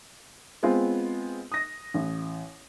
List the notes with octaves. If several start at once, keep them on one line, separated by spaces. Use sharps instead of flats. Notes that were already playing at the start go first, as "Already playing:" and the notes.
G#3 B3 C4 F4 G#4
D#6 A#6
A1